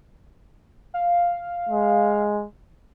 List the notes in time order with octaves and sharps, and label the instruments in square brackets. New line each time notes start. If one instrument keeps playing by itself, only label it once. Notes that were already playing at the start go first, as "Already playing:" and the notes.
[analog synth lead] F5
[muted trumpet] G#3